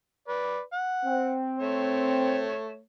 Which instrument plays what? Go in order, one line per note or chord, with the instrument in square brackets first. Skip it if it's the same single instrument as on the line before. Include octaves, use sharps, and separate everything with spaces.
[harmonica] B4 D5
F#5
[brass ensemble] C4
[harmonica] A3 C#5